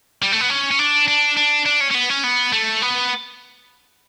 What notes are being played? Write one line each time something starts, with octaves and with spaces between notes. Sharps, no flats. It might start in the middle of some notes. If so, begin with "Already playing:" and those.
G3
A3
B3
C#4
C#4
D4
D4
D4
D4
C#4
C#4
B3
C#4
B3
A3
B3